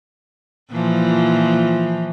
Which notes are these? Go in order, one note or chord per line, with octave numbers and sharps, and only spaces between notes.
A#2 E3 F3